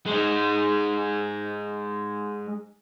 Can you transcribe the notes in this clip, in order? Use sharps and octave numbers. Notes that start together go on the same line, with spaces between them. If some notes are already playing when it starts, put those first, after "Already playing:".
G#3 D#4